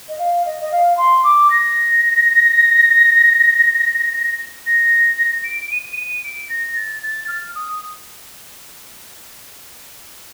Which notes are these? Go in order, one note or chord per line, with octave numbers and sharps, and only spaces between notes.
D#5
F5
D#5
D#5
F5
C6
D6
A#6
A#6
D7
D#7
D#7
D7
A#6
A6
A6
F6
D#6